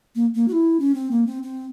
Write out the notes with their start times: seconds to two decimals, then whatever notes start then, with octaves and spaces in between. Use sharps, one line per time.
0.15 A#3
0.35 A#3
0.48 F#4
0.52 E4
0.80 C#4
0.94 C4
1.11 A#3
1.27 C4
1.43 C4